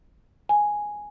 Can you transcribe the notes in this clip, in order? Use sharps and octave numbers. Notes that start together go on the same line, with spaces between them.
G#5